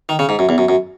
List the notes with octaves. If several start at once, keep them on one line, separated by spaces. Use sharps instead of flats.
D#3
C#3
G#2
F#2
E2
F#2
F#2